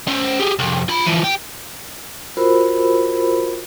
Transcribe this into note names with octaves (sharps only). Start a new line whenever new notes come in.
C#4 C5
G4 G#4
C2 F2
F4 B5
E3 F3
G4
F4 F#4 A#4 C5 B5 E6